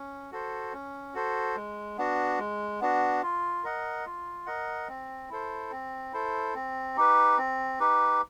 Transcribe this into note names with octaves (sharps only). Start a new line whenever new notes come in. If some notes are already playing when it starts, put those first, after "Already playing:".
Already playing: C#4
F#4 A4 C5
C#4
F#4 A4 C5
G#3
B3 D4 F#4
G#3
B3 D4 F#4
F4
A#4 D#5 F#5
F4
A#4 D#5 F#5
C4
E4 A4 C5
C4
E4 A4 C5
C4
D#4 G4 B4
C4
D#4 G4 B4